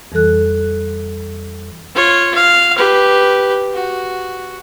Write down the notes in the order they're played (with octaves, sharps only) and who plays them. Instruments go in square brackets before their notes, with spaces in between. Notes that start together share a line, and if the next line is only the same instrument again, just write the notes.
[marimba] F2 E3 G3 A4 F#6
[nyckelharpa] F4 C#5
F5
G4 B4
F#4